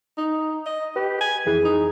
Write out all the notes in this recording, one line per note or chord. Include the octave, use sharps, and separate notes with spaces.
D#4
D#5
G4 B4
G#5
F2 E3 G#4
D#4